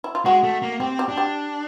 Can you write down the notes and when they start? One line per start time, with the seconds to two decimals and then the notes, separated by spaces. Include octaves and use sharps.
0.04 E4
0.15 F4
0.25 G#3 F#4
0.43 A3
0.62 A#3
0.80 C4 G4
0.99 G4
1.09 D4
1.17 G4